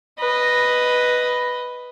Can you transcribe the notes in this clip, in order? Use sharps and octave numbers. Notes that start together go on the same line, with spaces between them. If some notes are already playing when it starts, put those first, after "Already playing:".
B4 D#5